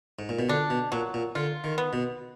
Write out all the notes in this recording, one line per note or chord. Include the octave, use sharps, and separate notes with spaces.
G#2
A#2
B2
D3 D4
B2
A#2 F#3
A#2
D3 F4
D#3
B3
B2